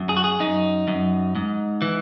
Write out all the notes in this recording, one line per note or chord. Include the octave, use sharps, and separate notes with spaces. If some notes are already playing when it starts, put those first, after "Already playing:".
Already playing: F#2
G#4
F#4
G#4
F#2 D#4
F#2
G#2
E3